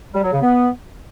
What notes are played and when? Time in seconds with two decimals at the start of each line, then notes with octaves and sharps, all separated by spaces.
0.14 G3
0.23 F#3
0.32 C#3
0.42 B3